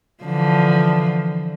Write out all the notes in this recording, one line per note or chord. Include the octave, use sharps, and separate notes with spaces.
D3 E3 F3